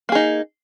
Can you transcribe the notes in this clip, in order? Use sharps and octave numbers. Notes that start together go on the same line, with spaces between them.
A#3 D#4 G#4